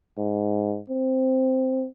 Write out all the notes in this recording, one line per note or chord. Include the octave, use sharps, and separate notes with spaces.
G#2
C4